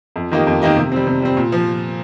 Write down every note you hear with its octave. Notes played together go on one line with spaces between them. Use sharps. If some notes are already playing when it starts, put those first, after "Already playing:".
F2
D#3 A#3 D#4 G4
F2
D#3 A#3 D#4 G4
C3
G3 C4
C3
G3 C4
A#2
F3